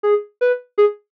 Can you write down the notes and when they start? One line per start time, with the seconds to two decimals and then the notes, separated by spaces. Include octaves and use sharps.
0.03 G#4
0.41 B4
0.78 G#4